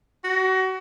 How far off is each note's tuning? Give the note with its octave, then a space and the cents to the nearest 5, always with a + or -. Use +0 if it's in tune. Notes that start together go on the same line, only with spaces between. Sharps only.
F#4 +30